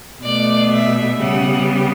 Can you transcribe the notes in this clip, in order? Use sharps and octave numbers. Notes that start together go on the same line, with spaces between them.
B2 A3 D5
E5
C#3 G3 B3 F#5